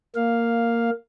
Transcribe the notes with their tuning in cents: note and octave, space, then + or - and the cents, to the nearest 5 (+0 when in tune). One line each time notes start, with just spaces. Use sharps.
A#3 -5 F5 +0